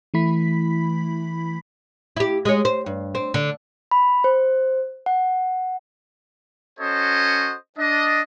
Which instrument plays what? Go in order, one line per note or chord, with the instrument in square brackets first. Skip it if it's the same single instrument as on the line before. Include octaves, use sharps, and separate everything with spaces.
[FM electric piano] E3 A3 E4 B5 B6
[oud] E4 G4
G#3 C#5
C5
G2
C4
D3
[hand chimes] B5
C5
F#5
[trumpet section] C#4 F#4 A4 C5 C#5 D#5
D4 D#5